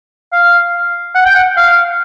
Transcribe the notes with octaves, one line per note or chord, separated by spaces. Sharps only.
F5
F#5
G5
F#5
F5